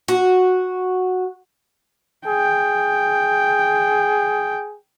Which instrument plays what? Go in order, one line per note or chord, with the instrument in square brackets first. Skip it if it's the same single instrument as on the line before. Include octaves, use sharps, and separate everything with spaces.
[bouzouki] F#4
[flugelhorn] G#4 [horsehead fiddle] G5